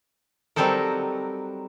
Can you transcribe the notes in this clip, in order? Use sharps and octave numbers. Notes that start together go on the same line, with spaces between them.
F#3 G3 C4 D#4 A4 A#4